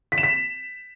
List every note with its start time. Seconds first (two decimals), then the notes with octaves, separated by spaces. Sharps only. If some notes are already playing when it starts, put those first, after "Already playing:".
0.12 B6
0.18 E7
0.23 B6